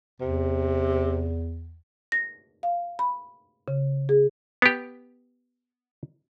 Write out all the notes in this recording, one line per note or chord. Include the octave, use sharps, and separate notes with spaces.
E2 C3
A#6
F5
B5
C#3
G#4
B3 G4